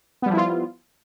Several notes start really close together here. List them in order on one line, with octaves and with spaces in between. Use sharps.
B3 G3 F3 E4 F4